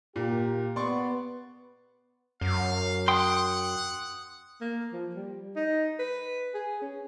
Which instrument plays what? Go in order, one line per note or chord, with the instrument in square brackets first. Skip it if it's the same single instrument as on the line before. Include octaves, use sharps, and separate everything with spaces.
[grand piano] A#2 [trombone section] A#3 G4
[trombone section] B3 [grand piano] D5 C6 C#6
[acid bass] F#2 [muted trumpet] F5
[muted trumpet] F#5 [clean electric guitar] G5 C6 [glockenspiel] D#6
[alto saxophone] A#3
F3
G3
D#4
B4
G#4
C#4